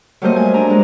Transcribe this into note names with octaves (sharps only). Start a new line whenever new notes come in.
F#3 G3 A3 A#3 C5 D#5
G#5
D4 G#5 A#5
G#3